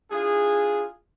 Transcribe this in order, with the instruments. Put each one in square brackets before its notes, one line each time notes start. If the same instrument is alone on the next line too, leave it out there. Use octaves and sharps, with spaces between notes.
[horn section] D4 E4 F4 G#4